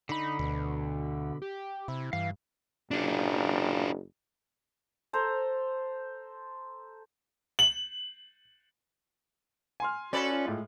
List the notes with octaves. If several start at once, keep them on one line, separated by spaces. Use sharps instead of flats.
D3 D#4 B5
D2 B2
G4
C3 E4
G2 E3 F5
F#1 D4 F4
A4 C5 A#5
F#7
G#5 C6 F6
C#4 F#4 A4 B4 D5
F4
A2 G#3